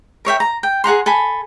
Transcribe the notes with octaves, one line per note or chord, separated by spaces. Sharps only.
A#4 C#5 E5 G5
A#5
G5
G#4 F#5 A#5 C6
A4 G#5 B5